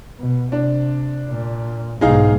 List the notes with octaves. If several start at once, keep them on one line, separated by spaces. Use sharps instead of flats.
B2
C3 D4
A#2
B1 G#2 D#4 G#4 F5